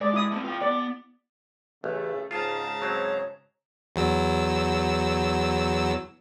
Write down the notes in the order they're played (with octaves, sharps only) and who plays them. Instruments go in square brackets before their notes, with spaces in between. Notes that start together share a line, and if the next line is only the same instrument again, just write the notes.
[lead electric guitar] G#3 [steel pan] D5
[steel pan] E4 D#6
[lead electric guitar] A3 C4
F4 G5
[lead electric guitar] B3 [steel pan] D5
[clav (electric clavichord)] A1 [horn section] C#3 A3
[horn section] G#2 C#3 [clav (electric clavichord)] F4 [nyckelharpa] A5 A#5
[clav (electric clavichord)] F#3 C4 [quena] C#5
[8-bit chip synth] E2 F#3 E6